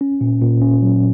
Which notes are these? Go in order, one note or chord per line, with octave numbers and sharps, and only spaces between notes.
C#4
A#2
A#2
C#4
F#3